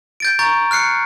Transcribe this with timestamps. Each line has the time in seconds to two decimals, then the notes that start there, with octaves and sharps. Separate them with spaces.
0.20 G6 A6 D7
0.39 A#5 C#6 G6 A6
0.71 F6 F#6 C7 C#7